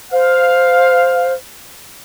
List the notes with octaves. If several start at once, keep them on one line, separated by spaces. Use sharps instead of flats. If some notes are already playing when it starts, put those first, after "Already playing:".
C5 F5